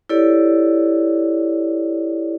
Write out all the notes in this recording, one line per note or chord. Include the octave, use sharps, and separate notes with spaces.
E4 G4 A4 C#5 D5